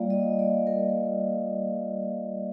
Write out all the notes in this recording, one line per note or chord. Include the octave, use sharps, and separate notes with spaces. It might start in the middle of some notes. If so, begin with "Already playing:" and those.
Already playing: G3 A#3 F4 D5 F5
D#5
D5
A#4